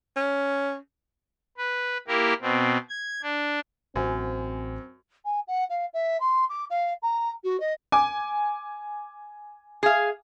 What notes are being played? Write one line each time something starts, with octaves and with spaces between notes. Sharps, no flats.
C#4
B4
A#3 E4 G4 A#4
B2 C4
G#6
D4
A1 F#2 C4 F#4 C5 G#5
G#5
F#5
F5
E5
C6
D6
F5
A#5
F#4
D#5
G#5 D6
G#4 F5